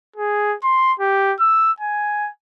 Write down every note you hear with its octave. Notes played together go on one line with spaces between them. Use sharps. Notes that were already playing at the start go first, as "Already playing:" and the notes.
G#4
C6
G4
E6
G#5